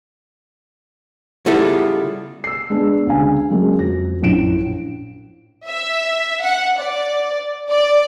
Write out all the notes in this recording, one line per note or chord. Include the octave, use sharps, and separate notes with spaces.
C#3 G3 B3 E4 F4 A4
E6 C7
G#3 B3 D4
D2 C#3 G#3 F5 G#5
F#3 G#3 A#3 C#4
F2 F#4 A#6
A#1 F#2 A2 D7 E7
E5
F#5
D5
D5